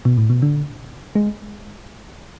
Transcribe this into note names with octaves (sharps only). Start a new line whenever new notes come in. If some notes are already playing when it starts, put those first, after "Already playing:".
B2
A2
B2
D3
G#3